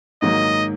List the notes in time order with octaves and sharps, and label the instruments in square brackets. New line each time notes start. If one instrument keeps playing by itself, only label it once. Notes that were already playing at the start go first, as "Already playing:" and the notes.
[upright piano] G#2 D#3 F#3 A#3 [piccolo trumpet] D#5